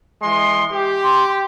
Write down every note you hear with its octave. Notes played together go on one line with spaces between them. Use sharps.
E3 G#3 C6
G4
C6